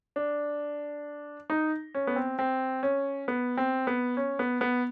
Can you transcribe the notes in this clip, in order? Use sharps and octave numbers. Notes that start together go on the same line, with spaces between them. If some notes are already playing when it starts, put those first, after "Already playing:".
D4
D#4
C#4
B3
C4
C4
C#4
B3
C4
B3
C#4
B3
B3